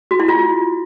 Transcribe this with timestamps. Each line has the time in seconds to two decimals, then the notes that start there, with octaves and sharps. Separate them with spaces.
0.11 F#4
0.20 E4
0.28 F4